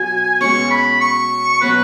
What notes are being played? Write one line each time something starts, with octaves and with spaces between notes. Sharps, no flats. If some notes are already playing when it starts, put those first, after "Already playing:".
Already playing: B2 F#3 G#5
B2 G#3 C#4 C#6
B5
C#6
B2 F#3 C#4 F#4 B4